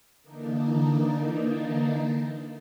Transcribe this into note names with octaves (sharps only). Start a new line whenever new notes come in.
D3 E3 A#3 D4 D#4